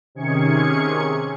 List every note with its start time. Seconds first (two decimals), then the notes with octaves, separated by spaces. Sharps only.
0.15 C3 D#3 C#4 G#4 G#6 C#7